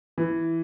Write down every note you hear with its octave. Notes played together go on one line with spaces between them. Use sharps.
E3